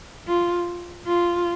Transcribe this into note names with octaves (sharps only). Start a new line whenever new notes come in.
F4
F4